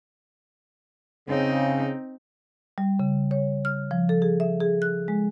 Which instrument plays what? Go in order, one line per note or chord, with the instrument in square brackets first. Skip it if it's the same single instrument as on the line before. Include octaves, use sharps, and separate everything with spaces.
[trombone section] C#3 [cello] C4 D#4
[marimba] G3
C#3
C#5
F6
F3
A4
G#4
E5
G#4
F#6
G#3